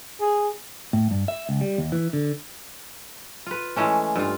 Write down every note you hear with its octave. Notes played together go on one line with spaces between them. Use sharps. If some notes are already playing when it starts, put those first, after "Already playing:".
G#4
A2
G2
E5
C#2
G3
D#2
E3
D3
F4 B4
E3 G#3 A3 C#4
G2 F4